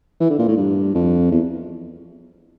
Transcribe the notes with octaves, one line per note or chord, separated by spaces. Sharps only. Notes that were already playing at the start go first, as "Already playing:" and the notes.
E3
D3
A#2
A2
G2
F2
E2